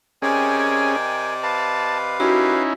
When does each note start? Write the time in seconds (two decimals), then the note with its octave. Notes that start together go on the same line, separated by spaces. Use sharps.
0.22 C3 C#4 G#4 A#4 D5 D#5 G5 G#5
1.43 B4 F5 A5
2.20 F#2 C#4 D#4 E4 F#4 G4